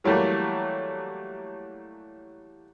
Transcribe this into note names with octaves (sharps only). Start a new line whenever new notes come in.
E3 F#3 G3 A3 A#3